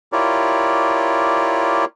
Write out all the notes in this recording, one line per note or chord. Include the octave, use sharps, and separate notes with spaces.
E4 F4 G4 A#4 C#5 D5